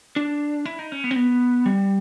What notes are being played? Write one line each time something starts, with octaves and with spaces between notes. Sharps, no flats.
D4
E4
D#4
C#4
B3
C4
B3
G3